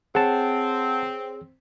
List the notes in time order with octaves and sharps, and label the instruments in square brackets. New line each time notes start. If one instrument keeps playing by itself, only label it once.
[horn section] C4 [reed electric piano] G#4 C#5 [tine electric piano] F#5 A5